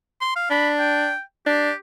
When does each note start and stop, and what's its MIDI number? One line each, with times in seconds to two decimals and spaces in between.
0.21 0.34 84
0.36 0.49 77
0.50 1.11 62
0.50 0.69 83
0.79 1.20 79
1.47 1.71 62
1.47 1.75 67